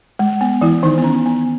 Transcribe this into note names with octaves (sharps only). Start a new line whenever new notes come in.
G#3
B3
E3 E4
D#3 D#4
B3
C#4
B3